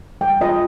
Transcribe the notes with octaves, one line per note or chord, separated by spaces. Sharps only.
G3 G5
F4 D#5